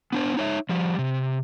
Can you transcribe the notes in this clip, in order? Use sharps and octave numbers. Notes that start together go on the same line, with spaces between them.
B3 D4 C5
D#4 C#5 E5
F3 G3
C3